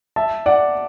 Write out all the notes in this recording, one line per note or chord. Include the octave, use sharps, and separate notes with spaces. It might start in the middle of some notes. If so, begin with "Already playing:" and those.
E5 A5
D5 F#5